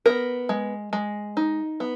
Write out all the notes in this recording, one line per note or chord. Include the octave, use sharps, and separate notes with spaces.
B3 A#4
G#3
G#3
D#4
B3